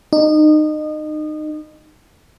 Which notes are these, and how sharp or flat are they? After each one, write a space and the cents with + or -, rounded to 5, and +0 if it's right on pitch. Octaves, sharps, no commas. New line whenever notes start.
D#4 -25